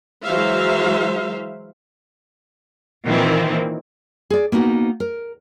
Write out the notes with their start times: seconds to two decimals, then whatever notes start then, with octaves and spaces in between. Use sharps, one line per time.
0.24 E3 F#3 G#3 C5 E5 F5
3.05 A#2 D#3 E3 A#3 C4
4.30 G#4 D5
4.52 A#3 B3 D#4 F#4
5.00 A#4